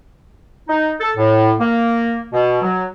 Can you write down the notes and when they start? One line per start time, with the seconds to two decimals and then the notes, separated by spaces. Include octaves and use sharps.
0.69 D#4
1.00 A4
1.17 A2
1.60 A#3
2.33 B2
2.62 F#3